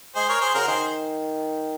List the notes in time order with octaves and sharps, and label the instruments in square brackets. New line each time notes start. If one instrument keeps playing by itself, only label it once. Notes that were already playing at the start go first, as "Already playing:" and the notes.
[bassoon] G#3 [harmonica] G#4 C5
[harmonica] A#4 C#5
G#4 C5
[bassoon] C#3 [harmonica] F#4 A#4
[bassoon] D#3 [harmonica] G#4 C5